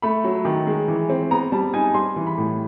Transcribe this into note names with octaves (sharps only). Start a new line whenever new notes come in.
A3 B5
F#3
D#3
G#3
E3
C4
B3 A#5
G3 A5
D#4 G#5
G3 C6
E3
B5
A2